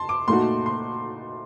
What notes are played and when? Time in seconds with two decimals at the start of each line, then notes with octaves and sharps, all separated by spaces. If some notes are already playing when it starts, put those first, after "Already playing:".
Already playing: A5 C6
0.09 D6
0.28 A#2 A3 D#4 F#4 C6
0.66 C6